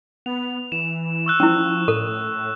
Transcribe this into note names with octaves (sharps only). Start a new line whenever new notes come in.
B3 F7
E3 E7
C#6 E6 F#6
F3 C#4 E4
A2 A4